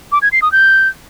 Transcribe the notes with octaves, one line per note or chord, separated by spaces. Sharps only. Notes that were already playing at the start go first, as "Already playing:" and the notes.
D6
G#6
C7
D#6
G6